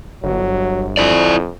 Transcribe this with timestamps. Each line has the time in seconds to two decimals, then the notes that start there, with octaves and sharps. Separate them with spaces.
0.24 G1 F#3
0.97 F2 E4 D5